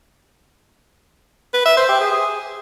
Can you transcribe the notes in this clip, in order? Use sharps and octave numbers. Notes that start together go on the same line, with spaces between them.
B4
E5
C5
G4
G#4